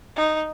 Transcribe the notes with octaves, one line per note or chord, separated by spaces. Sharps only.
D#4